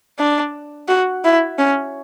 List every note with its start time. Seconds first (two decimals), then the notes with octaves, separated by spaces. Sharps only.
0.19 D4
0.88 F#4
1.24 E4
1.58 C#4